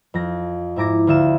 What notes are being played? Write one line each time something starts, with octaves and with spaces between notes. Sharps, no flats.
F2 A#6
G#2 E4 A#5 D6 A#6
D2 F4 E5 E7